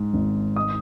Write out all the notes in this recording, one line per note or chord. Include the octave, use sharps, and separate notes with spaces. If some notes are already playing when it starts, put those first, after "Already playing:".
Already playing: G#2 D#4
G#1
D#6